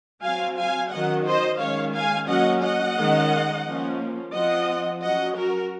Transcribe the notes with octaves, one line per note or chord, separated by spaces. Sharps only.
F#3 C4 F5 G#5
F5 G#5
D#3 F#3 C#4 D#5 F#5
C5 D#5
D#3 G#3 C#4 C#5 F5
F5 G#5
F#3 A#3 C#4 D#5 F#5
D#5 F#5
D#3 G#3 C#4
F3 A#3 C#4
F3 C4 D#5 F#5
F#3 C#4 D#5 F#5
F#4 A#4